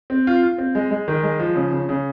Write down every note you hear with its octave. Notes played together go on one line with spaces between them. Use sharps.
C4
F4
F4
C4
G#3
G#3
D#3
G#3
F3
C#3
C#3
C#3